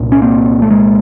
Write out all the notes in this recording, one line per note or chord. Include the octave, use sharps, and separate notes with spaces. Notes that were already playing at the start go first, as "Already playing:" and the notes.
Already playing: C2 A#2
C#4
A#3 C4
A3
G#3 A#3